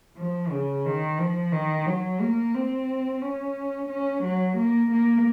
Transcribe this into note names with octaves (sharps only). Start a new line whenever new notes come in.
F3
C#3
D#3
F3
D#3
F#3
A#3
C4
C#4
C#4
F#3
A#3
A#3